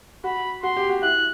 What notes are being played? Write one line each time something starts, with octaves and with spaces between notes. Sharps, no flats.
F#4 B5
F#4 C6
G4
F#4
E4 F#6